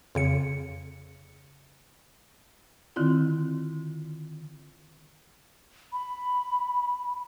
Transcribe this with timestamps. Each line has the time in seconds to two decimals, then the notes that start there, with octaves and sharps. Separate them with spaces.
0.15 F2 C#3 C#7
2.96 D3 D#3 C4 E4 F4
5.93 B5